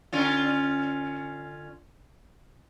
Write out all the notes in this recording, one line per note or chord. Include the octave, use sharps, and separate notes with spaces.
D3 C#4 F4